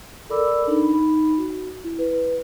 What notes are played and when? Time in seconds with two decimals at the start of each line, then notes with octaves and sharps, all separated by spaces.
0.30 A4 A#4 D5 B5 D6 E6
0.67 D4 D#4 B5
0.93 D#4 B5
1.38 F#4
1.84 E4
1.99 B4